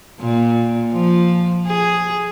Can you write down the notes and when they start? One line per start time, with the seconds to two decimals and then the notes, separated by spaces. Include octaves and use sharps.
0.21 A#2
0.92 F3
1.67 G#4